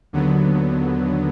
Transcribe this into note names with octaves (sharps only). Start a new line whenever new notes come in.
D#2 D3 F#3 B3